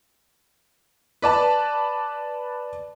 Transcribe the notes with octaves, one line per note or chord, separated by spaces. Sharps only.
B4 D5 A5